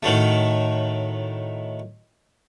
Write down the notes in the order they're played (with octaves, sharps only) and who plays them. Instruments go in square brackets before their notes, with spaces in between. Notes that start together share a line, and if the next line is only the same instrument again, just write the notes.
[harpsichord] A2 D#3 F#3 A3